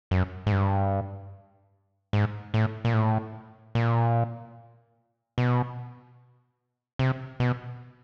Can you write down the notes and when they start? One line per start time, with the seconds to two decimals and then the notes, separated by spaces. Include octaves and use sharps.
0.11 F#2
0.47 G#2
0.52 G2
2.13 G#2
2.54 A2
2.85 A#2
2.94 A2
3.75 A#2
5.38 B2
6.99 C3
7.40 B2